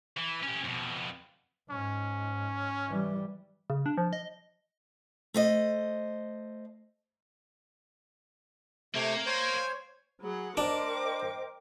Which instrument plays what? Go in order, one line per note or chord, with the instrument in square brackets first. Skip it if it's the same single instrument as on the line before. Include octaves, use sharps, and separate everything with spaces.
[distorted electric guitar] E3
C#4 G4
F2 B2
[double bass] G#2 [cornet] C#4
[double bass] E3 G3
[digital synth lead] C#3
D4
F3
D#5
[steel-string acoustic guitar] A3 C5 D#5
[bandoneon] C3 A3 [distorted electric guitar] A#3 [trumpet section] C5 C#5
[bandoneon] C5 C#5 [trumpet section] G5 G#5
[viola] F#3 F#5 [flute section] G#4 B5
[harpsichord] D4 [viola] A#4 D6 [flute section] C5 D#5 G5